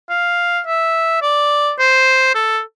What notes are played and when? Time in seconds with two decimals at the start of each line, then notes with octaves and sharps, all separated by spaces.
0.09 F5
0.66 E5
1.22 D5
1.79 C5
2.35 A4